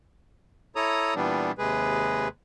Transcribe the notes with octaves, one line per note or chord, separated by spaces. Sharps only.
E4 A4 C#5 A#5 D#6
A#2 E3 G3 B3 D4
D#2 C3 G#3 G#4 B4